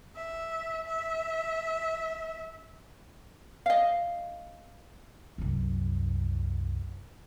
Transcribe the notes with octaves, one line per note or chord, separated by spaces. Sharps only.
E5
E5
D#5 F5
C2 F#2